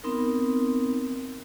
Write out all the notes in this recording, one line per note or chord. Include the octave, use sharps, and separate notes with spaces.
B3 C4 D#4 A#4